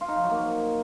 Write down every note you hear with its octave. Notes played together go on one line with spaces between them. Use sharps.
F4
D#4
F3
F#3
A#3